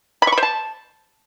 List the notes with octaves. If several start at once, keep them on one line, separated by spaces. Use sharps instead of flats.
B5
C#6
B5
C5
A5